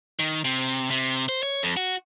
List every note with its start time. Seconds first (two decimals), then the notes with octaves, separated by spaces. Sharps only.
0.19 D#3
0.45 C3
0.90 C3
1.29 C5
1.43 C#5
1.63 F2
1.77 F#4